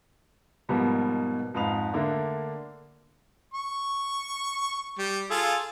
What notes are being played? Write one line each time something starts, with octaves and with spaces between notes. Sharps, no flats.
G#2 B2 F3 G3 A#3 B3
F2 G#2 B4 F5 D#6 F7
D3 A3 A#3 D4
C#6
G3
F4 G#4 A4